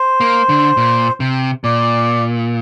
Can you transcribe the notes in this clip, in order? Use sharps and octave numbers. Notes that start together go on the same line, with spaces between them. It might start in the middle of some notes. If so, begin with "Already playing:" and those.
Already playing: C5
A#3
D3
A#2
C3
A#2 D5